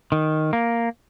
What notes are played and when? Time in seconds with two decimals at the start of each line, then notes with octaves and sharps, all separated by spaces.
0.12 D#3
0.53 A#3